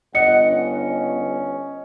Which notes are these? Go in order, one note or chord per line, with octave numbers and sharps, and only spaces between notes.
G1 D#5 F#5 C#7
C#4